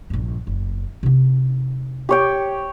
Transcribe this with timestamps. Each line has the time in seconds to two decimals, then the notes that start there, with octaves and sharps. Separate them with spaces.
0.10 A#1 G2
0.47 F#1
1.03 C3 D#4
2.09 G4 C#5 G5